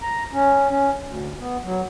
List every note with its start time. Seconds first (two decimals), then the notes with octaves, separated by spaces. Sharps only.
0.01 A#5
0.33 C#4
0.70 C#4
1.03 D2
1.39 B3
1.64 F#3